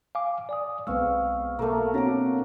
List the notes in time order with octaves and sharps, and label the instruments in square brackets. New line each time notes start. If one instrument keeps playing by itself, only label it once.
[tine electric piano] F5 G#5 D6
D5 G#5 D#6
[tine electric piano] B1 C#6 E6 [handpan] G#3 B3 C4 [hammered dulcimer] F5
[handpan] B2 A4 A#4 [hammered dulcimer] A3 A#3
[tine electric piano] C4 D4 C#5 [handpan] F#4 [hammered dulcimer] A#5 D6